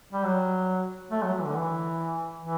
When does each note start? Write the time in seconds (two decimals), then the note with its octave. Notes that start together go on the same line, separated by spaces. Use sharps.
0.13 G3
0.25 F#3
1.11 A3
1.22 F#3
1.33 F#3
1.39 E3
1.45 D3
1.55 E3
2.42 E3